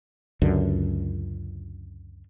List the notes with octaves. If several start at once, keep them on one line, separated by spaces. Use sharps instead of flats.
C#2 F#2 D3